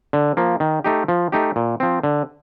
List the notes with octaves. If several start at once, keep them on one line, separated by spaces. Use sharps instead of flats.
D3
F3 A#3
D#3
A3 D#4 G4
F3
A3 D#4 G4
A#2
F3 C4
D3